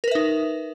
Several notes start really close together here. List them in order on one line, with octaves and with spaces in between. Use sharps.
A#4 B4 E5 D#4